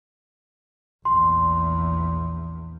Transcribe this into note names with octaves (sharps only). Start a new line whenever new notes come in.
A#1 E2 C6